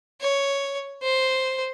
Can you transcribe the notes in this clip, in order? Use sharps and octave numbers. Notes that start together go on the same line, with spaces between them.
C#5
C5